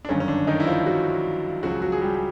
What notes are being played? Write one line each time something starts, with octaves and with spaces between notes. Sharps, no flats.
D4
G1 F#2 D#3 C#4
C#4
D3 D4
D#3 D#4
E4
F3 F4
F#3 F#4
C#2 C#3 F3 F#3 F#4
F#3 F#4
G#4
G3 G4
G#4